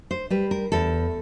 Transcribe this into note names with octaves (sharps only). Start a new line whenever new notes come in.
C5
G3 B4
A#4
E2 A4